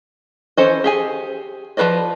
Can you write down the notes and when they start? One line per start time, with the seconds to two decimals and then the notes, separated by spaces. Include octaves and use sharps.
0.57 E3 C#4 A4 C5 D#5
0.84 G4 G#4 G#5
1.77 F3 G#4 B4 D5 D#5